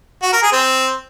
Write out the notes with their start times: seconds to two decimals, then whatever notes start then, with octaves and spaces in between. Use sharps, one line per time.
0.23 F#4
0.33 A#4
0.42 G#4
0.52 C4